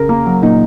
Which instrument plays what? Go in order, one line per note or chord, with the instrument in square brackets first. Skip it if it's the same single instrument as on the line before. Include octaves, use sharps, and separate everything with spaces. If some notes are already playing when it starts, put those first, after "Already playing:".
Already playing: [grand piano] C#3 [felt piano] A#4
[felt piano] A#3
F#3
[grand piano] A#2 [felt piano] D#4